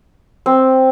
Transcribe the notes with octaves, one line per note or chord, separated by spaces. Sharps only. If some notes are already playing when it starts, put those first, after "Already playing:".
C4